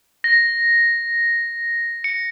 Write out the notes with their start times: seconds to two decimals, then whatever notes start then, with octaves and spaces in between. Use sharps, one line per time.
0.24 A#6
2.04 C#7